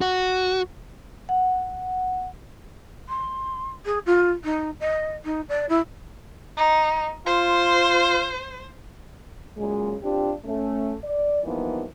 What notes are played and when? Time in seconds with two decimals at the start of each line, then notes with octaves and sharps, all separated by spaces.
0.01 F#4
1.29 F#5
3.09 C6
3.85 G#4
4.06 F4
4.44 D#4
4.80 D#5
5.24 D#4
5.49 D5
5.69 E4
6.57 D#4
7.26 F4 C5
9.57 A#2 C#3 F#3 G#3
10.03 C4 D4 F4 G4
10.45 A3 C#4
11.04 D5
11.43 E3 F3 G3 A#3 B3 D#4